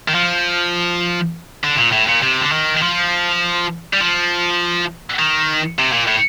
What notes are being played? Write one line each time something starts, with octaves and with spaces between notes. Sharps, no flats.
D#3
F3
D3
A#2
A2
A#2
C3
D3
D#3
D#3
F3
G3
F3
D#3
C3
A#2
A2